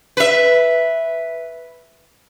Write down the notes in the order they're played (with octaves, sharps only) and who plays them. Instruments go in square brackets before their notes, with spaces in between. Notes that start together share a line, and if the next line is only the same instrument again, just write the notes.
[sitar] B4 E5